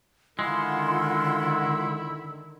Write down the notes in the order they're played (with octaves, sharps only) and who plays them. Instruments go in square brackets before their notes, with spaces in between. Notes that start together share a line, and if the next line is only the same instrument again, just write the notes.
[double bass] D3 D#3 [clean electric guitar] G#3 [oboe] E4 [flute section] F4 F#5 C6